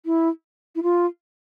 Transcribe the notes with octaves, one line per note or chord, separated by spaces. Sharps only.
E4
E4
F4